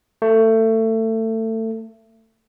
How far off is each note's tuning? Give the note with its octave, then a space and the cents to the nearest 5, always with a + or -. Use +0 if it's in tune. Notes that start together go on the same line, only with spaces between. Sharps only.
A3 +25